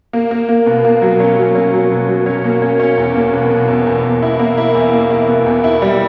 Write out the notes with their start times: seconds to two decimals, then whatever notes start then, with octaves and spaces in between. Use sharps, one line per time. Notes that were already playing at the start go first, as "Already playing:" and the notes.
0.13 A#3
0.31 A#3
0.49 A#3
0.66 B2
0.85 A#3
1.02 F#3
1.20 C#4
1.37 F#3
1.55 C#4
1.74 F#3
1.91 B2
2.09 F#3
2.26 C#4
2.44 A#3
2.62 C#4
2.80 C#4
2.98 E2
3.15 A#3
3.33 B2
3.50 B2
3.68 E2
3.87 E2
4.04 E2
4.22 E4
4.39 A#3
4.57 E4
4.75 E2
4.93 A#3
5.11 E4
5.28 B2
5.46 E2
5.64 E4
5.82 G3